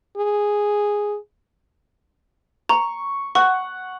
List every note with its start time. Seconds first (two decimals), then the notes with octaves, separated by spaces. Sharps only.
0.17 G#4
2.69 A#5 C#6
3.35 F#5 C#6